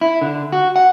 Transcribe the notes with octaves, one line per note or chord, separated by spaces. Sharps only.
E4
D3
F#4
F#5